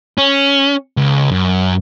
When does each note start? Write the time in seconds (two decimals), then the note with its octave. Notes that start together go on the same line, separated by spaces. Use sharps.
0.18 C#4
0.97 C#2
1.31 F#2